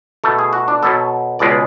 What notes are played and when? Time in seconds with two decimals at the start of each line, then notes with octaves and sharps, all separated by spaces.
0.24 B2 A3 A4
0.39 G#4
0.53 F#4
0.68 D4
0.83 B2 F#3 B3 A4
1.39 C#2 B2 G#3 B3 D5